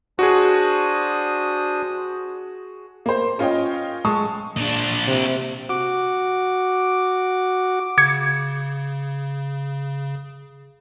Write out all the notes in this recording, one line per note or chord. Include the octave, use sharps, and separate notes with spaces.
D4 F#4 G#4 C5 D#6
A#3 C5
C#4 F4 C#5 D#5 G5
G#3 A5 C#6 D#6
A#2 D4
C3
F#4 D6
C#3 D6 G#6 C#7